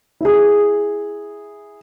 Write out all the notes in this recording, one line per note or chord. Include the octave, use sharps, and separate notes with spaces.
E4 G#4